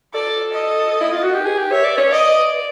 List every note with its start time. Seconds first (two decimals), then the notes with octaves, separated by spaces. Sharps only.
0.14 A4 D5
0.53 D#5
1.01 E4
1.12 F4
1.24 F#4
1.34 G4
1.46 G#4
1.59 G4
1.72 C#5 E5
1.85 D5
1.98 C#5
2.11 D5 D#5